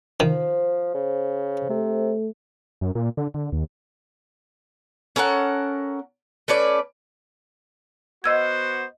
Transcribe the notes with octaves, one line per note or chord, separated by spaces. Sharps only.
D#3 F3 C5
C#3
C3 A3
F#2
A#2
D3
D3
D#2
C#4 A4 A#4 F#5
A3 C#4 B4 D5
B3 F#4 C5 D#5 E6 G#6